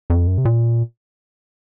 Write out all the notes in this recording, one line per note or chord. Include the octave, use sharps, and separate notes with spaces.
F2
F#2
C3
A#2